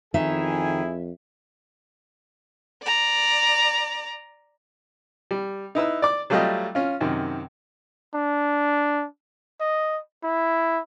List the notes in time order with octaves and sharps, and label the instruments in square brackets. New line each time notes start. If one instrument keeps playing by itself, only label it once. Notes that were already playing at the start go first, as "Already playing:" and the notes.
[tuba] F2 [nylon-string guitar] D#3 [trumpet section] E4 G#4 G#5 [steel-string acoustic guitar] E5
[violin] D5 A#5
[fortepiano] G3
D#4 E4 B4 E6
D5 D6
F#3 G3 A3 F4 G4 D#5
C#4 F4
F#2 C3 D#3
[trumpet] D4
D#5
E4